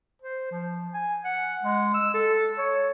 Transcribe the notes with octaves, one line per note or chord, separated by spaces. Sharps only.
C5
F3
G#5
F#5
G#3
E6
A4
C#5